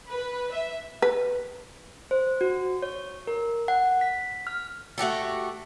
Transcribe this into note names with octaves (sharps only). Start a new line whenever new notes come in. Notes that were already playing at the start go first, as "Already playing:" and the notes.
B4
E5
B4
C5
F#4
C#5
A#4
F#5
B6
F6
A3 F#4 G4 A4